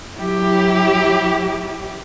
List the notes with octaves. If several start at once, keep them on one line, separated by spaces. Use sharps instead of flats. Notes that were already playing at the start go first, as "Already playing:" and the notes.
F#3 E4 G4